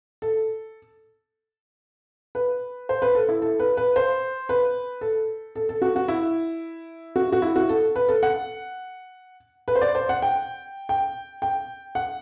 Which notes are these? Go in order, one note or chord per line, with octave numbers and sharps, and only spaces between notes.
A4
B4
C5
B4
A4
E4
A4
B4
B4
C5
B4
A4
A4
A4
F#4
F#4
E4
F#4
F#4
E4
F#4
A4
B4
A4
F#5
B4
C5
D5
C5
F#5
G5
G5
G5
F#5